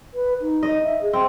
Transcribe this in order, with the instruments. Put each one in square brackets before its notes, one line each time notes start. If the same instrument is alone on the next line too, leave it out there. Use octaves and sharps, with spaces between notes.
[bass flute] B4
D#4
[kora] D#5
[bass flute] E5
G#4
[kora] C4